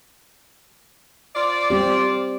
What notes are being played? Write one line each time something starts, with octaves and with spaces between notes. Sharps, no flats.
F4 C5 D5
G3 C4 G4